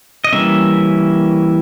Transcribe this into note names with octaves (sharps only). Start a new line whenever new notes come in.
D#5
E3 G3 A#3 C#4 E5